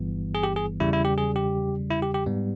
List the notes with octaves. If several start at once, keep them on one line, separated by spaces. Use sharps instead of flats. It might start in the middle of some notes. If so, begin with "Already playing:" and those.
Already playing: G1 G2 E3 G3 B3
G#4
G4
G#4
E2 C#3 G3 E4
E4
G4
G#4
G4
E4
G4
G4
G#2 G3 B3